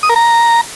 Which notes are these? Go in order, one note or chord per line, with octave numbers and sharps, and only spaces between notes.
D#6
A#4
A#5